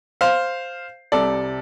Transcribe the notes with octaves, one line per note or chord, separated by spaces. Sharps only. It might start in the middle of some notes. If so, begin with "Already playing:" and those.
C5 F5
C2 C3 G3 A4 D5